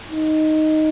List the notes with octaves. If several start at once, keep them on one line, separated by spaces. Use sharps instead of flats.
D#4